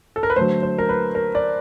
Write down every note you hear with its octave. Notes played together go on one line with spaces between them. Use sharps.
A4
A#4
B4
D3 F#3 A3 C5
C5
A#4
B4
A#4
D5